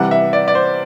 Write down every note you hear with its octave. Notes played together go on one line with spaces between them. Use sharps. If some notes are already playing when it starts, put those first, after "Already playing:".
Already playing: C3 E3 G3 F#5
E5
D5
D5
C5